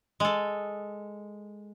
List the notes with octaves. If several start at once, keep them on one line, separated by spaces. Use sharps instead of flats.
G#3 A4